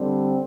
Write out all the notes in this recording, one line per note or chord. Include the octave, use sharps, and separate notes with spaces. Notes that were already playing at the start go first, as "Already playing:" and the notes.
Already playing: D3 G3 C4